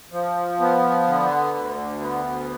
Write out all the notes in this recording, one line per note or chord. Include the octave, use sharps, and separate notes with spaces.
F3
B3
D3
D2
B3